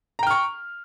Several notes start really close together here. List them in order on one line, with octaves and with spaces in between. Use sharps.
A#5 G5 F6 C#6